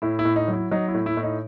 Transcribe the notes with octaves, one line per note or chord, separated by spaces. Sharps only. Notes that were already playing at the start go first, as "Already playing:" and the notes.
A2 E4
E4
A2
D#4
F#3
E4
F#3 D#4
E4
A2
E4
A2
D#4